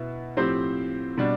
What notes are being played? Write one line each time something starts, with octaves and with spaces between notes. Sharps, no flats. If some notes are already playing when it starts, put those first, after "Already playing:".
Already playing: B2 B3 E4
A2 F3 C4 G4 C5
B2 G3 D4